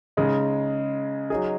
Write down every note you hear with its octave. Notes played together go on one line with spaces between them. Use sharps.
C#3 G#3 D#4
F#3 D#4 G#4